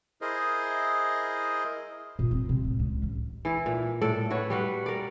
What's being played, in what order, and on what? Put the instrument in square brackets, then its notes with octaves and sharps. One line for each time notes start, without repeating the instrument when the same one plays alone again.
[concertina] E4 G#4 A#4 C5 D#5
[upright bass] A#2
C4
C3
A2
C#2
A1
[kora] E3 E4
A#2
A2 A4 D5
F#4 B4 C#5
G3 F#4 B4
A#4 D5